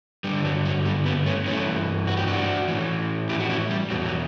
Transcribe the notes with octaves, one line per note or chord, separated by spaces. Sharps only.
G2 D3 G3
F#3
F#3
G3
G3 B3
A3 C#4
G2 E3 A3 C#4
F#4
G4
D4 F#4
A2 E3
E4 G4
F#4
C#4 E4
G3
E2 B2 F#3
F#3